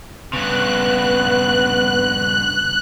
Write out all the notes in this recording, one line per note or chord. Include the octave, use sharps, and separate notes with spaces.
G2 C#3 B3 F#6